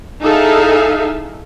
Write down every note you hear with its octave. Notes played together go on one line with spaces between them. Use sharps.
D#4 E4 G#4 A4 E5 F5